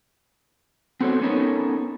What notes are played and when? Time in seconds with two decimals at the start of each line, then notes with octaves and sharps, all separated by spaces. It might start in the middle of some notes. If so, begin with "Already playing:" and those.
1.01 B3 C4 F#4 A4 C5 C#5
1.21 B3 C#4 D#4 A4 A#4 C#5